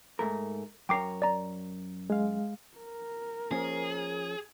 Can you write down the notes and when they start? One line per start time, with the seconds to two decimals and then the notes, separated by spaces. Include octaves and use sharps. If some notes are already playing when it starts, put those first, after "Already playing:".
0.19 G#2 A3 A#4
0.89 F#2 A#4 C#5 G5 D6 C7
1.22 D5 A#5
2.10 G#3 F5
2.77 A#4
3.51 F3 A#3 C#4 G#4